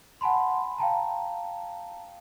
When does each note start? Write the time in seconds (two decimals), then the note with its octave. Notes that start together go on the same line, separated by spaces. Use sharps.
0.21 F#5 G#5 A5 B5 C6
0.78 F5 G5 A5 A#5